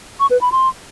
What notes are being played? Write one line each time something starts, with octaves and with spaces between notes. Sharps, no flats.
C#6
B4
B5
C6